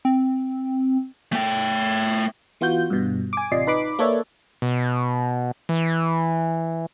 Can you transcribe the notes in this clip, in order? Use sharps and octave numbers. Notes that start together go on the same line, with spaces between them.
C4
A3 G5
E3 B3 F4 F#4 G6
G2 B2
G#5 D6
A1 C3 F4 D5 D#5 C7
D#4 B4 B5 D6
A#3 A4 B4 C#5 D5 E5
B2
E3